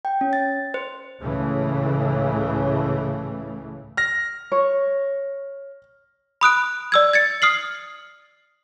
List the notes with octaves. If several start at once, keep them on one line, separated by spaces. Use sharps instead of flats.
G5
C#4
A6
C5
C#2 A2 C#3 E3 A3
F6 A#6
C#5
B5 D#6 F#6 D7
D5 E6 G#6
G#6 A6 C#7
D#6 F6 C7 F#7